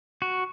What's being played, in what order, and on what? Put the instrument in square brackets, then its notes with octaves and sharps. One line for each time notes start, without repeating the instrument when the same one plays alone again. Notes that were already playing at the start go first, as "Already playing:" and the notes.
[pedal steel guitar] F#4